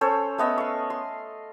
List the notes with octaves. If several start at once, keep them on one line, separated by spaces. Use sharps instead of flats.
C#4 A4 C5 C#5
A3 B3 D#5 E6
F5 C#6
C6